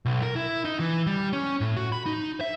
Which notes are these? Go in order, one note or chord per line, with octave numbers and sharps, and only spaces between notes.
B1
A#4
E4
D#4
E3
G3
C#4
A2
F#4
B5
D#4
E5